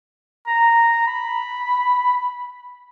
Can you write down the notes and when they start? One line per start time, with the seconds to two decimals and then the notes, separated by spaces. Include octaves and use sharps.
0.47 A#5
1.07 B5